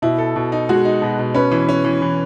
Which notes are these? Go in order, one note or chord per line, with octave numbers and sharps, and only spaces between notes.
B2 E4
A4
B2
D#4
G#3 F#4
D#4
B2
B2
C#4 B4
E3
C#4
E3
E3